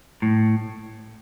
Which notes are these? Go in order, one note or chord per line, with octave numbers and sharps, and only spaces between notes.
A2